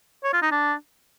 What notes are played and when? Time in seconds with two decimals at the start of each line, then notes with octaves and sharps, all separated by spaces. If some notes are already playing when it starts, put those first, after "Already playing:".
0.24 C#5
0.33 F4
0.42 D#4
0.51 D4